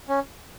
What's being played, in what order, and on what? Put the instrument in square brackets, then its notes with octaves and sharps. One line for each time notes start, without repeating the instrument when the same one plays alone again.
[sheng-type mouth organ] C#4